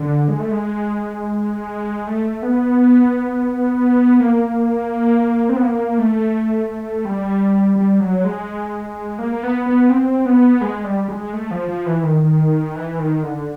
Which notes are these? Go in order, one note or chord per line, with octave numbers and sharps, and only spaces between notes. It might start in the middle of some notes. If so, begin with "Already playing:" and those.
Already playing: D3
G#3
A3
G#3
A3
B3
A#3
C4
B3
A#3
A3
G3
G3
F#3
G#3
A#3
A#3
B3
B3
C4
B3
G#3
G3
G#3
A3
F3
F3
E3
D#3
E3
D#3
D3